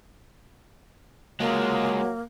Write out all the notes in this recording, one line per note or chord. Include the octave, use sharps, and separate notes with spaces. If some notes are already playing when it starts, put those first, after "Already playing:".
F#3 G#3 A#3 F4